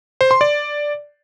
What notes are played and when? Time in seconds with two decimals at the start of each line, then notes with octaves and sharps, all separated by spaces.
0.21 C5
0.31 C6
0.41 D5